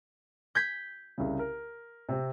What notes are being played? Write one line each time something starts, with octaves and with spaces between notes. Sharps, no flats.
G6 G#6 B6
C2 C#3
A#4
C3 C4